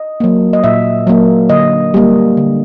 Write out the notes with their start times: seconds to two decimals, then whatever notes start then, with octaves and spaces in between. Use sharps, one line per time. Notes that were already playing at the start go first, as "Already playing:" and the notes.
Already playing: D#5
0.20 F#3 A#3
0.53 D#5
0.64 A#2 E5
1.07 F#3 A#3
1.50 D3 D#5
1.94 G3 A#3
2.37 D3